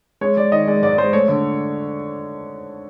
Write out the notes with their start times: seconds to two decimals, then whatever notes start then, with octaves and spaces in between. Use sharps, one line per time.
0.21 G#3 C#5
0.37 G#3 D5
0.52 D#3 D#5
0.67 G#3 D5
0.82 G#2 D5
0.98 G#3 C5
1.13 A3 C#5
1.28 D3